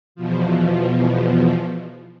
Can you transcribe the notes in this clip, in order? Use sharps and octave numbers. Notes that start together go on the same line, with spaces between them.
E2 B2 F3